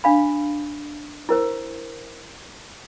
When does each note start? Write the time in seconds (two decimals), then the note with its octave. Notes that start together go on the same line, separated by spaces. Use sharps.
0.04 D4 F5 B5
1.29 E4 A#4 C5